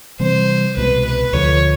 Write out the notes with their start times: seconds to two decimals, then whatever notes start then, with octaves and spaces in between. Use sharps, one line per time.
0.20 C3 E3 G3 C4 C5
0.76 C2 B2 G#3 B4
1.05 B4
1.33 D2 D3 F3 C#5